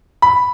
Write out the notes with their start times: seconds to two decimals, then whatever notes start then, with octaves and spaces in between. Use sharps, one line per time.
0.22 B5